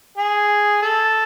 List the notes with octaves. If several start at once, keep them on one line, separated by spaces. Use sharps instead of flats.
G#4
A4